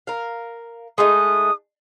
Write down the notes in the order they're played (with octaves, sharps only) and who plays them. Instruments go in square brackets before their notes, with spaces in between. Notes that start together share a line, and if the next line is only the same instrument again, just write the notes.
[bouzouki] A#4 F5
[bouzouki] G#3 A3 D#4 [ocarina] D#6